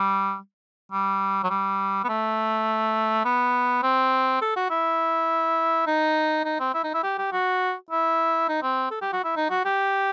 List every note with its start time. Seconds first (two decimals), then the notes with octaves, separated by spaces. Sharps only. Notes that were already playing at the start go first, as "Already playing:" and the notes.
Already playing: G3
0.92 G3
1.44 F#3
1.50 G3
2.04 B3
2.09 A3
3.25 B3
3.83 C4
4.41 A4
4.56 F#4
4.70 E4
5.87 D#4
6.45 D#4
6.60 C4
6.74 E4
6.84 D#4
6.94 E4
7.03 G4
7.18 G4
7.32 F#4
7.91 E4
8.49 D#4
8.63 C4
8.91 A4
9.01 G4
9.13 F#4
9.24 E4
9.36 D#4
9.50 F#4
9.65 G4